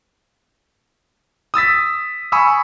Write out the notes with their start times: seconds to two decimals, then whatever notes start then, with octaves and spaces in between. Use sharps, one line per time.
1.54 D#6 E6 A6 B6
2.32 G#5 B5 C#6 D#6 E6